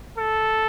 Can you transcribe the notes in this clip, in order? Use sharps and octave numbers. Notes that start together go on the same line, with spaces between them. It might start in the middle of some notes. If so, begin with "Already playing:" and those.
A4